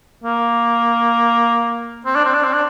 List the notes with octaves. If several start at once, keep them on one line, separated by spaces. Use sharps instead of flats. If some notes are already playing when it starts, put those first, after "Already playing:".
A#3
C4
D4
C4
D4
C4
D4